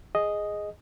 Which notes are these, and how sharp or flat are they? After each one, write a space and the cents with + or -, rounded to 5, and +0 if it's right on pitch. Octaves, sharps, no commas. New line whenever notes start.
G#4 +0 D#5 +0